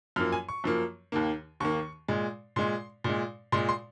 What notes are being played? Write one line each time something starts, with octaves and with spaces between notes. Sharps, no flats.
F#2 F3 A#3 F6
G#5
C#6
F#2 F3 A#3
D#2 D#3 A#3
D#2 D#3 A#3 C#6
A#2 G#3
A#2 G#3 C6
A#2 G#3
A#2 G#3 C6
C6